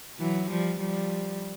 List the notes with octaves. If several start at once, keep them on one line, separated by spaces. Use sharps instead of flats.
E3 F#3
F3 G3
F3 G3